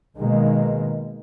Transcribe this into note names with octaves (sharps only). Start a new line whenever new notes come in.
B2 D#3 G#3 A#3